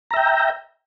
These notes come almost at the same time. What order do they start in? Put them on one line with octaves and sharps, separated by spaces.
A#5 E5 G5